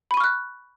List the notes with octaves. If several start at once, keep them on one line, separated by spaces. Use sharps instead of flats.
B5 C#6 F6 F#6 D#7